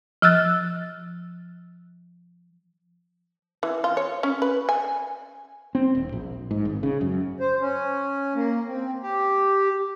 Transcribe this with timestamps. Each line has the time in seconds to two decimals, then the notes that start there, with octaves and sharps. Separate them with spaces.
0.22 F3 E6 F#6 A6
3.63 E3
3.84 F4
3.97 C#5
4.23 C#4
4.42 B4
4.69 G#5
5.75 C4
5.95 D#1
6.12 A#1
6.51 G#2
6.65 G#1
6.83 C#3
7.01 F#2
7.40 C5
7.61 C#4
8.35 A#3
8.68 C4
9.03 G4